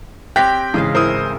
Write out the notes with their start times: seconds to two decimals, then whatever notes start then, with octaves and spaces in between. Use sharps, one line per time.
0.36 C4 G4 C#5 G5 F#6 A#6 B6
0.74 A1 G#2 C#3 G#4 D#5 F5
0.95 E4 A#4 C5 D#6